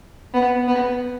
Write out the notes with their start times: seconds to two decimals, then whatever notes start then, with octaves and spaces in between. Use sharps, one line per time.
0.34 B3
0.67 B3